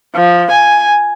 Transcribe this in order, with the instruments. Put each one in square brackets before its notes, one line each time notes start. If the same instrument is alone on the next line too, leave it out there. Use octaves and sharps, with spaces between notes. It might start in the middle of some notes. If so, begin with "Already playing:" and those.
[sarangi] F3
G#5